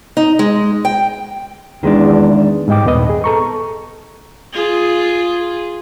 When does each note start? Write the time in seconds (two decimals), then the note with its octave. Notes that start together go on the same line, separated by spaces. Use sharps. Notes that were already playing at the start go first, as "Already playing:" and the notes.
0.17 D#4
0.39 G#3
0.85 G5
1.83 E2 D#3 G#3 D4
2.68 G#2 G3 D#5 G5 D6
2.85 D#2 A#2 B3 B4 D#5
3.09 G#4
3.24 A4 A#5 C#6
4.53 F4 G#4